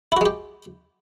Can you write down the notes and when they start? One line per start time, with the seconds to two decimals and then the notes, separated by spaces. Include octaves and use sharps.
0.12 E4
0.17 F#4
0.21 G#3
0.26 G4